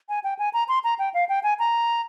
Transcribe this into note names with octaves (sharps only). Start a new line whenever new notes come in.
G#5
G5
G#5
A#5
C6
A#5
G5
F5
G5
G#5
A#5